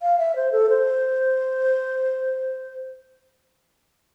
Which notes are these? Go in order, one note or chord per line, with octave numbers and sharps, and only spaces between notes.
F5
E5
C5
A4
C5